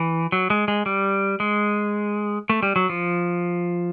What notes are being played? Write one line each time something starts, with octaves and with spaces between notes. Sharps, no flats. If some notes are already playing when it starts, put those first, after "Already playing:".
Already playing: E3
F#3
G#3
G#3
G3
G#3
A3
G3
F#3
F3